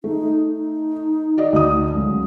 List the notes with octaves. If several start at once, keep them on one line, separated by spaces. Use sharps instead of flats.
A3 D#4
D#4
F#4 D5 D#5
D2 D#6
C#2 F#3